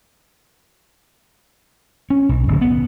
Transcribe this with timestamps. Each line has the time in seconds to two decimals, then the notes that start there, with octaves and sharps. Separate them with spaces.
2.10 C#4
2.29 B1
2.47 D1
2.61 B3